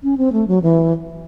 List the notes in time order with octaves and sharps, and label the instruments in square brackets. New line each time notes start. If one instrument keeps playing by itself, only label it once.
[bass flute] C#4
C4
A3
F#3
E3